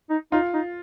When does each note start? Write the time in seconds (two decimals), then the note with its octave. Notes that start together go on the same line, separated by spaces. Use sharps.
0.10 D#4
0.32 D#4 F4
0.54 D#4